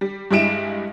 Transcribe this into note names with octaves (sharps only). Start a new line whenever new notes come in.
G3
G2 G3 G#3 E4 D7 E7